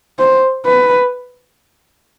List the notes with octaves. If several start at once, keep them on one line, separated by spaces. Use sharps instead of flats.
C5
B4